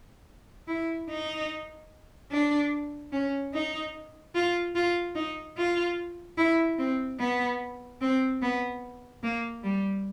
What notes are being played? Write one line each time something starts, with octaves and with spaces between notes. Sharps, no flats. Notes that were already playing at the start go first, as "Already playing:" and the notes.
E4
D#4
D4
C#4
D#4
F4
F4
D#4
F4
E4
C4
B3
C4
B3
A#3
G3